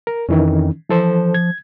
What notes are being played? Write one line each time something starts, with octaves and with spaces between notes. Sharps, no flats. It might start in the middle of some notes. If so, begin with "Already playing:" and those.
A#4
F2 D#3 E3 C#4
E3 F3 A4 C5
G#6